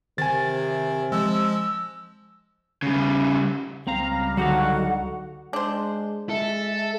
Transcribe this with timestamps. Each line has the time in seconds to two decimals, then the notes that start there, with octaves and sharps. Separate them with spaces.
0.18 C3 D#3 G#5 A6
1.12 F3 G#3 E6
2.83 C#3 G3
3.87 C#2 G3 C4 F5 A#5
4.37 D3 F#3 D#4 F#4 A4 F5 F#5
5.53 G#3 D4 C5
6.29 G#3 A4 E5